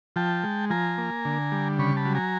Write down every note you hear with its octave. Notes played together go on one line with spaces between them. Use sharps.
F3 G5 A5
G#3
F3 G#5 A#5
A#3
D3
G3
C#3 B5 C#6
A5 B5
F#3
G#5 A#5